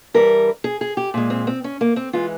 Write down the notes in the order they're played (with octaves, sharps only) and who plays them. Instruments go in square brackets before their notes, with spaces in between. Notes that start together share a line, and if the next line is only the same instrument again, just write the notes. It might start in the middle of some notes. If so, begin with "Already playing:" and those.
[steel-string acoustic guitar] G2 E3 G3 A#4
G#4
G#4
G4
A#2 G#3
C4
C4
C#4
A#3
C4
E3 G#3 F4